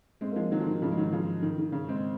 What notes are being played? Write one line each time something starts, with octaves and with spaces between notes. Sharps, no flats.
G#3 C4
A#3
F3 G#3
D#3 F#3
F3
D#3
C#3 F3
G#3
D#3 F#3
C#3 F3
D#3
D#3
C#3
G#3 C4